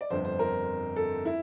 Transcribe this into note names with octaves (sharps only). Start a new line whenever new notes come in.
D5
G1 F2 D3 C5
C5
A#4
A4
E4